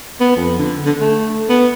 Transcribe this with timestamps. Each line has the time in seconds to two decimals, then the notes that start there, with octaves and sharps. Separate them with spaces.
0.20 B3
0.36 F2
0.59 D3
0.85 D3
1.01 A3
1.49 B3